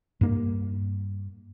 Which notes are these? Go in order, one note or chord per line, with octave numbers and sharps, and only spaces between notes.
G2 A#3